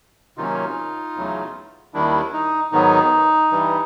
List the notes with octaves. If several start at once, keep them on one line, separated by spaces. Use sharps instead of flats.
C3 D#3 F#3 A#3 C#4 D#4 F4
E2 C#3 F#3 A3
D#2 D#3 G3 D4 E4
D#4
G#2 D#3 F#3 B3 D#4
G2 E3 G3